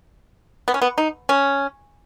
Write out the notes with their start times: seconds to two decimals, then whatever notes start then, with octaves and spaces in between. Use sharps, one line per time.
0.68 B3
0.74 C#4
0.82 B3
0.98 D#4
1.29 C#4